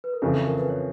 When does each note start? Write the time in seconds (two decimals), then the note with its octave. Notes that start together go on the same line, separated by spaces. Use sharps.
0.04 B4
0.14 A#4
0.22 F2 C#3 E3 A4
0.33 A4
0.46 A#4
0.58 B4
0.69 C#5